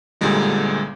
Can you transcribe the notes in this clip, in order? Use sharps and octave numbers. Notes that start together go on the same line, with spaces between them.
G1 A#2 D3 G3 G#3 D#4